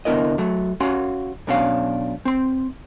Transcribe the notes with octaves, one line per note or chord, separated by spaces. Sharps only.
C2 D3 B3 E4 A#4 D#5
F#3 A3
C#4 F#4 F5 F#5 C6
B1 B2 C#4 D4 E4 F5
C4 C6